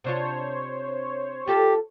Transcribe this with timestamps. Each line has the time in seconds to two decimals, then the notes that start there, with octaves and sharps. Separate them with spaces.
0.04 C3 D4 F4 C5 C#5
1.48 F4 G4 A4